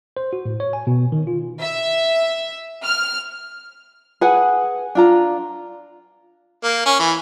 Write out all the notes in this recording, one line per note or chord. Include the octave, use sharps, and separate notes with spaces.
C5
F#4
A2
C#5
G#5
B2
D#3
F4
E5
F6
G#4 B4 F#5 G#5
D4 F4 A#5
A#3
C#4
E3